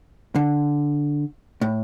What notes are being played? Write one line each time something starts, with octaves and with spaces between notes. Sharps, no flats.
D3
A2